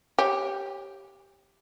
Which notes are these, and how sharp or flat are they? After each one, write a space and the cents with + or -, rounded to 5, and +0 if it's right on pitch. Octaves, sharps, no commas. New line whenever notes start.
G4 +0 C#5 -20 G#5 -45